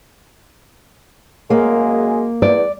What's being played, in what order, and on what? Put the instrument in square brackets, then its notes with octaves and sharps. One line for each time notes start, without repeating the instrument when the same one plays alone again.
[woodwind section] F#2 G#3 G#4 [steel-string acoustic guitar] A#3
[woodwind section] E2 [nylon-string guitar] D5